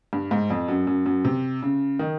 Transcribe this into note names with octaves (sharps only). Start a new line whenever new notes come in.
G2
G#2
F2
F#2
F#2
F#2
C3
C#3
D#3